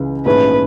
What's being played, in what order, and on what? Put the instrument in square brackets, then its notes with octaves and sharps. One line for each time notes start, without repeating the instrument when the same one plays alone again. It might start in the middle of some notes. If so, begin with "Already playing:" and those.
Already playing: [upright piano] C#2 C#3 E3
[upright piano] A#1 G#2 E3 A3 C#4 [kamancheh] B4